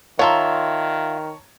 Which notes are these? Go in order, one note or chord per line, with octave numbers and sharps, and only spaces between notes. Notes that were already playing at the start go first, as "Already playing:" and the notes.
D#3 F4 C#5 E5 A5 A#5 C6